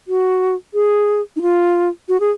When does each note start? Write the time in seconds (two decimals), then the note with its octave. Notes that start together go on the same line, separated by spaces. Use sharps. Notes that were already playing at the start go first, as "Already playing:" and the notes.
0.08 F#4
0.74 G#4
1.36 D#4
1.42 F4
2.09 F#4
2.20 G#4